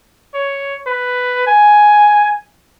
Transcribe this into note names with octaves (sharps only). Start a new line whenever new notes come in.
C#5
B4
G#5